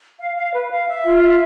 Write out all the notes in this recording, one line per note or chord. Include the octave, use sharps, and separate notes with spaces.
F5
F5
B4
F5
E5
F4
E5